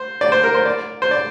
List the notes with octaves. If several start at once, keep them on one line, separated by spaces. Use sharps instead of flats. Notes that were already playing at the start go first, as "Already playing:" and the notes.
Already playing: C5
D5
C5
A#4
C5
D5
C5
D5